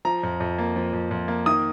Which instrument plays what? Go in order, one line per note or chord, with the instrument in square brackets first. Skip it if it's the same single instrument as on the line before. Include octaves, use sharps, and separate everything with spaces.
[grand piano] F3 A#5
F2
F2
A#3
F3
F2
F2
A#3
D#3 D#6